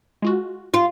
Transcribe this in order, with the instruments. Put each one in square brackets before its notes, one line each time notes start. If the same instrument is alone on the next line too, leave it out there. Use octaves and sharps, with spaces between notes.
[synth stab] G#3 F4 F#4
[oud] F4